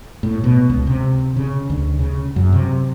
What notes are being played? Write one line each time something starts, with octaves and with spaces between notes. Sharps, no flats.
A2
B2
C#2
C3
C#3
D2
C#3
F#2
C3